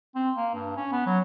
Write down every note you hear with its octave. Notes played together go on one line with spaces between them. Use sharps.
C4
A#3
G2
C#4
B3
F#3